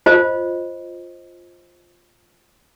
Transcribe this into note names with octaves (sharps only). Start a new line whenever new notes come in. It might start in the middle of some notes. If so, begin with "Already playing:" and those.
F4 C5 D#5